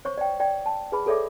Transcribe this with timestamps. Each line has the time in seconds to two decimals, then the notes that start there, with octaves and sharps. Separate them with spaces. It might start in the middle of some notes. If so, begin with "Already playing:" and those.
0.05 C5 C#5 C#6
0.18 D5 G5
0.40 D5 G5
0.66 A5
0.92 G#4 B4 B5
1.06 G#4 A4 C#5 D5 E5 D6